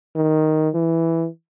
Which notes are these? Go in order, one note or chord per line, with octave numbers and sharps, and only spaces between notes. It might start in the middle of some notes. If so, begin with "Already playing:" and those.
D#3
E3